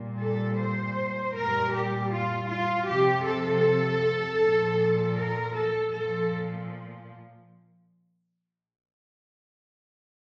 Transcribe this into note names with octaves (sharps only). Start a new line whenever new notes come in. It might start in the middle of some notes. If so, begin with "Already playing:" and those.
Already playing: A#2 G3
A4
C5
A#2 G3 A#4
G4
F4
F4
C3 F3 G4
A4
A#2 F3
A#4
A4
A#2 F3 A4